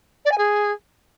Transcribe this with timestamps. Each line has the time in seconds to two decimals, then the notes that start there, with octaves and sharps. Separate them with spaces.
0.25 D5
0.31 G#5
0.37 G#4